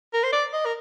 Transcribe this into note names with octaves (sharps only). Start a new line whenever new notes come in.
A#4
C5
D5
D#5
A#4